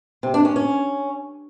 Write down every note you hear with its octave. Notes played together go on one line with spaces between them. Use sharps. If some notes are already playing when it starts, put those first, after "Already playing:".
C3
D4
C#4
C#4